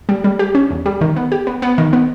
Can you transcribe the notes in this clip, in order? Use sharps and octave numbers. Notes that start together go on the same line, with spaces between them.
G3
G3
G4
C#4
E2
G3
D#3
B3
G4
B3
B3
D#3
B3